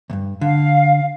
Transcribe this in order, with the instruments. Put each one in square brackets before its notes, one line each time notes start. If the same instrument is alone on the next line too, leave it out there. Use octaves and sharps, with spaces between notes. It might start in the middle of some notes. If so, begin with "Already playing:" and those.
[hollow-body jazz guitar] D2 G2
[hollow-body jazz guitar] D3 [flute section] F5